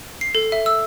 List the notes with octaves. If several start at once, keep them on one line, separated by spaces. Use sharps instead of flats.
C7
A4
E5
E6